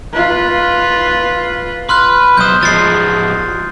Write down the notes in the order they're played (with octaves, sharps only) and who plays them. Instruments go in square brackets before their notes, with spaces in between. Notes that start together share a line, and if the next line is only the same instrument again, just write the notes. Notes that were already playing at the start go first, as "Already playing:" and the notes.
[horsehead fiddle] F4 B4
[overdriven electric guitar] B4 [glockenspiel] C6 F6 F#6
[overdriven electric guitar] B1 C5 [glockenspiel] D#6 G6
[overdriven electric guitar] F3 G#3 [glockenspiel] A6 C7